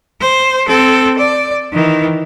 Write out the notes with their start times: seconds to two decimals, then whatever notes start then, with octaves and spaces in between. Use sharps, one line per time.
0.21 C5
0.67 C4 A4
1.18 D5
1.73 D#3 E3